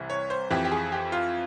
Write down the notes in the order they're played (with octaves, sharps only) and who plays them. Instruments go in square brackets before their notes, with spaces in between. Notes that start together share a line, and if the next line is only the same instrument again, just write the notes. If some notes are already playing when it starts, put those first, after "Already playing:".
Already playing: [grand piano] C2 C3 E3
C#5
C5
F2 E3 G4
G4
G#4
G4
F4